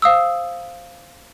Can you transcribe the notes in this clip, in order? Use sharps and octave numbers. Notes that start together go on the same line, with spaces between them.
C5 F5 D#6 E6